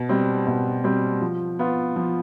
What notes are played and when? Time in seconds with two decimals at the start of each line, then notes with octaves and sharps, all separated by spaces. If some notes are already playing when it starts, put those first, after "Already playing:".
Already playing: B2
0.09 G3 C4
0.47 B2
0.84 G3 C4
1.22 F3
1.59 B3 F4
1.96 F3